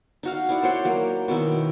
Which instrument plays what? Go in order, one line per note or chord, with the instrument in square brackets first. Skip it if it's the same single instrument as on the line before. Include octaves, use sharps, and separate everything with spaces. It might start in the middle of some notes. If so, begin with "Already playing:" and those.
[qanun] D#4 F#4 F5
E4 D5 F#5
C5 C#5 F#5 C6
F#3 A#3
B2 D#3 E4